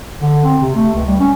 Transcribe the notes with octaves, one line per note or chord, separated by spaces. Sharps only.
D3
C4
C3
A3
C#2
G3
C#4